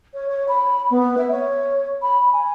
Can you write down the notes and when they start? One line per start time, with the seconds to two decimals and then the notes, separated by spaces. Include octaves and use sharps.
0.14 C#5
0.29 C#5
0.49 B5
0.91 B3
1.18 E5
1.31 C#5
2.02 B5
2.33 G#5